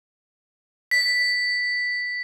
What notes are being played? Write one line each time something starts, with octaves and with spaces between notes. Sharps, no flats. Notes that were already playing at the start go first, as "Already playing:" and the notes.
B6